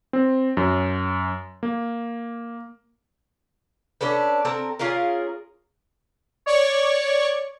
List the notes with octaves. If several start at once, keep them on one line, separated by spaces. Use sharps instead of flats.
C4
F#2
A#3
C#4 D4 A4 B4
C4 A4 A#4
C#4 F4 G#4 A#4
C#5 D5 C#6